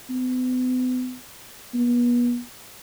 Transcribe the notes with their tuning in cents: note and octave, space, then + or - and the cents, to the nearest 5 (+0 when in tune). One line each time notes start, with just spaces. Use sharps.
B3 +40
B3 -35